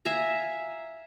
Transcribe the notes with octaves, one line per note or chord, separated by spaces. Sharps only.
E5 F5 G#5 A#5